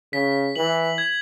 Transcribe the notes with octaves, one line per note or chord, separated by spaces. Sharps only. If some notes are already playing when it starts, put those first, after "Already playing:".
C#3 B6
E3 F#7
G#6